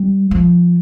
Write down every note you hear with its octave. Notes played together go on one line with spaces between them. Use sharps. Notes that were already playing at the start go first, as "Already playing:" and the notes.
Already playing: G3
F3